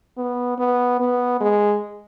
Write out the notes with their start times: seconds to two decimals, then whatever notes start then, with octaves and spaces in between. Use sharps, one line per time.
0.17 B3
0.58 B3
1.00 B3
1.41 G#3